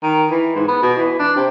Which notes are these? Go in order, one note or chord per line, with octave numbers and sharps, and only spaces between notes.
D#3
E3
G#2
B3
B2
E3
D4
C3